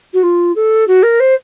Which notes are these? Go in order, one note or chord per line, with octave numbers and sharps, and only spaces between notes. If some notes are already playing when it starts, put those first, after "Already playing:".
F#4
F4
A4
F#4
A#4
C5